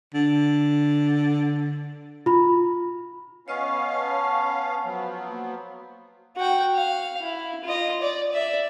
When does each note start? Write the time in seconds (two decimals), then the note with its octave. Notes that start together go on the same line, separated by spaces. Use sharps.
0.14 D3
2.26 F4 B5
3.48 B3 C#4 C#5 D#5 F5 C#6
3.92 A5 C#6
4.85 F3 F#3 B3
5.28 A#3
6.37 F#4 G5
6.75 F5
7.22 E4
7.64 F4 D#5
8.02 D5
8.33 D5 E5